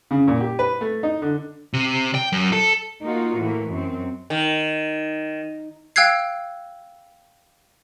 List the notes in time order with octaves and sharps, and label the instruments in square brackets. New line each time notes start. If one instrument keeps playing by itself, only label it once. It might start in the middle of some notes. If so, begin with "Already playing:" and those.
[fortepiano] C#3
A#2
G4
B4
A3
D#4
D3
[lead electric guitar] C3
G5
F#2
A4
[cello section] A#3 D#4 F4 F#4
A2 E3 A#3
F#2 C4
[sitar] D#3
[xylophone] F5 G5 E6 F#6 G#6 C7